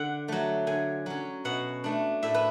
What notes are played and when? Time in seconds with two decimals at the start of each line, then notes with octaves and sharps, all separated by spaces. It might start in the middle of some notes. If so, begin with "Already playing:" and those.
Already playing: D3 F#5
0.28 F#3 A3
0.67 D3 G#5
1.06 F#3 C#4
1.45 B2 F#5
1.84 A3 D4
2.23 A2 E5
2.34 B4